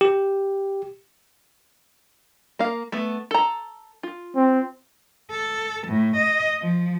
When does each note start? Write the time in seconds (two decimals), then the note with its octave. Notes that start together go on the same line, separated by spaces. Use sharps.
0.01 G4
2.59 A#3 F5
2.92 A3 B3
3.31 A4 A#5
4.03 F4
4.36 C4
5.31 A4
5.87 A2
6.16 D#5
6.62 F3